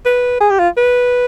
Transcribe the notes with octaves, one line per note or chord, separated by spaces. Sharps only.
B4
G#4
G4
F4
B4